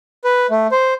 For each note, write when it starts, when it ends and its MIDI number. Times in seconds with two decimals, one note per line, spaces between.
0.24 0.47 71
0.50 0.67 57
0.71 0.94 72